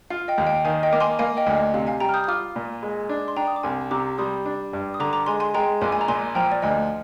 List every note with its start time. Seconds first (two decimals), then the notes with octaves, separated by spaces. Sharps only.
0.10 F4 F5
0.28 D#5 G5
0.38 D#2
0.46 D#5 G5
0.65 D#3 F5 G#5
0.83 D#5 G5
0.93 A#3 D6
1.01 G#5 C6
1.19 A#3 F5 G#5
1.37 D#5 G5
1.46 D2
1.55 D#5
1.74 C3 F5
1.87 F5 G#5
2.00 G3 G5 A#5
2.09 F6
2.14 D#6 G6
2.24 D#6
2.28 F4 D6 F6
2.56 A#2
2.82 G#3
3.09 D4
3.28 C6
3.36 D4 G5 A#5
3.47 D#6
3.56 D6
3.63 C2 G#5 C6
3.91 C3 A#5 D6
4.18 G3 C6 D#6
4.46 D4
4.73 G2
4.94 D#6
5.00 D3 A#5 D6
5.13 A#5 D6
5.26 G#3 G#5 C6
5.40 G#5 C6
5.54 G#3 G5 A#5
5.81 A#1 G#5 C6
5.92 G#5
6.01 A#5
6.08 A#2 G#5 C6
6.35 F3 G5 A#5
6.52 D5
6.62 D2 D#5